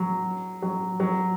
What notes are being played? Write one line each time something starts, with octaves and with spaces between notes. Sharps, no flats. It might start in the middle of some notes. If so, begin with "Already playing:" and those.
Already playing: F#3
F#3
F#3